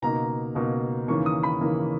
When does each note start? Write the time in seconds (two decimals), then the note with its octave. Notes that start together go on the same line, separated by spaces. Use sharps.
0.02 C#2 B2 A#3 D#4 A#5
0.55 C#2 B2 A#3 D#4
1.08 D#2 C#3 E3 A#3 C#6
1.26 D#6
1.43 B5
1.61 D#2 C#3 E3 A#3